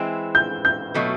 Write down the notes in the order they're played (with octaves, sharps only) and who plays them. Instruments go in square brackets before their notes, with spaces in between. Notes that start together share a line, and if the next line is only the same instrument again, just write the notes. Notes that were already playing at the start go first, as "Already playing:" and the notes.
Already playing: [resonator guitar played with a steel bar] E3 G#3 C4 E4
[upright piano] G6
G6
[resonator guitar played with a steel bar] B2 F#3 A3